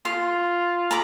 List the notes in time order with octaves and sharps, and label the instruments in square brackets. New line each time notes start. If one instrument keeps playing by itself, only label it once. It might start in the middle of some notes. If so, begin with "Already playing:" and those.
[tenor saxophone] F4 [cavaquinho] C6
[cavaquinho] A#5 B5 D6